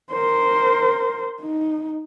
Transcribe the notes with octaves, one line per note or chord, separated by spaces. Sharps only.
A#4 C5
D#4